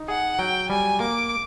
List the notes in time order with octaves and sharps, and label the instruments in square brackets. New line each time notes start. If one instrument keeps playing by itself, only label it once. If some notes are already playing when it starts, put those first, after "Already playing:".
Already playing: [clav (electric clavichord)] D#4
[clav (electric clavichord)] G#4 [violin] F#5
[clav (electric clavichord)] F#3 [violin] G5
[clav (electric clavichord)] G3 [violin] G#5
[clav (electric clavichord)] A#3 [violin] D6